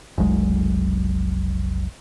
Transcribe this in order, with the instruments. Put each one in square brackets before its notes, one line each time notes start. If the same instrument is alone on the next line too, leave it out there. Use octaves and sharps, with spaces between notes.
[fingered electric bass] F1 B1 F#3 G#3